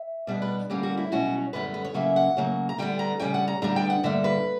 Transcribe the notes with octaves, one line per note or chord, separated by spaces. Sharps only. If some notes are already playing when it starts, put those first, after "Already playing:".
Already playing: E5
B2 G3 B3 D4 D5
B4
D3 G3 A#3 C#4 G4
F#4
E4
B2 F#3 C#4 F#4
F#2 D3 G3 B3 B4
B4
C#5
C#3 F#3 A#3 C#4 E5
F#5
C#3 F#3 A#3
A#5
D3 G3 B3 G5
A#5
C#3 G3 C#4 G5
F#5
A#5
G2 D3 G3 B3 D4 A#5
G5
F#5
G2 D3 G3 A#3 E5
B4